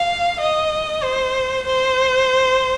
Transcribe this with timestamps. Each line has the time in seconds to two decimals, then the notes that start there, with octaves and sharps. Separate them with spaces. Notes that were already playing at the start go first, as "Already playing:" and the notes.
Already playing: F5
0.40 D#5
1.03 C5
1.66 C5